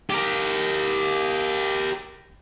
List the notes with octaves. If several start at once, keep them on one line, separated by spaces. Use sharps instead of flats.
G4 A#4